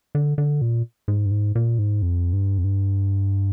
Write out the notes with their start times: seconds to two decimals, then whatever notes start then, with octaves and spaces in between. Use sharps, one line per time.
0.15 D3
0.38 D3
0.61 A#2
1.08 G#2
1.25 G2
1.31 G#2
1.55 A#2
1.79 G#2
2.02 F2
2.33 G2
2.58 F2
2.64 G2